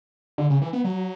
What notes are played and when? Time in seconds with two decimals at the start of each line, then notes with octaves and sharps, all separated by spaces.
0.38 D3
0.50 C#3
0.62 E3
0.73 B3
0.84 F#3